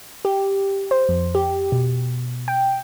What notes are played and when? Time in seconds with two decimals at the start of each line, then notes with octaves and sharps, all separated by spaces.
0.25 G4
0.91 C5
1.09 F2
1.35 G4
1.72 B2
2.48 G5